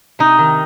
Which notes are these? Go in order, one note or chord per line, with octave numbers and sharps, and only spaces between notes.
C3 D#4
D#3